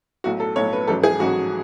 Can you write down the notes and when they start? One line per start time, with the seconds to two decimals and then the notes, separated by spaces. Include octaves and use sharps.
0.24 B1 A2 F#3 F#4
0.40 A4
0.56 B1 A2 F#3 C#5
0.73 B4
0.88 A1 G#2 F#3 A4
1.04 G#4
1.19 A1 G#2 F#3 F#4